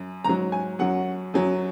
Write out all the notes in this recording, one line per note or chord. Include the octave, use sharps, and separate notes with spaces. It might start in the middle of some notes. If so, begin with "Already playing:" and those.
Already playing: F#2
G#2 F#3 A#5
G#5
F#2 F#3 F#5
F#2 F#3